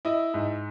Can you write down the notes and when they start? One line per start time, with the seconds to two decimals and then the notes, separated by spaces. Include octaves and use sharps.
0.05 E4 D#5
0.34 G#2